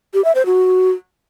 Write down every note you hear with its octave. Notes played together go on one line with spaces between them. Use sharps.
G4
E5
C5
F#4